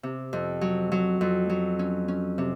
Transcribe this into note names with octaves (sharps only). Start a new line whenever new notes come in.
C3
F2
F#3
F#3
F2
F#3
C#4
C#4
C3